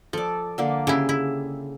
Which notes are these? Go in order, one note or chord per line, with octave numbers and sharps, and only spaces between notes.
F3 A4 D5
D3 A#3 D5
C#3 E4 G4 G#4
E4